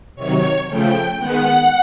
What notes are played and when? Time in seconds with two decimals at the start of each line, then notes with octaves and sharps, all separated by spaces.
0.15 C3 D#3 F#3 C#5
0.67 C#3 F3 A3 G5
1.18 D#3 G#3 B3 F#5